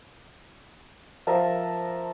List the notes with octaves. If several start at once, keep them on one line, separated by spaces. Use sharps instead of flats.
F3 A#4 E5 A5